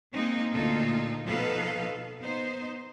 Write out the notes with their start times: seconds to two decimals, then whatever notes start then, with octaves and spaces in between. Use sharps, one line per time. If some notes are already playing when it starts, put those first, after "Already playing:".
0.13 G#3 A#3 C4 D#4
0.53 D2 A#2 D#4 F4 A4
1.25 B2 F3 D#4 A4 B4 F5
2.21 B3 D#4 C5